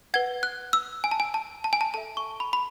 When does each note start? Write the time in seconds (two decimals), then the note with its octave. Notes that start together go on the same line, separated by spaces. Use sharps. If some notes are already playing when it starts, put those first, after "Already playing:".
0.14 B4 F#5 G#6
0.43 F#6
0.73 E6
1.04 G#5
1.11 A5
1.20 G#5
1.34 A5
1.64 A5
1.73 G#5
1.81 A5
1.94 A4 E5 A5
2.17 C#6
2.40 B5
2.53 B5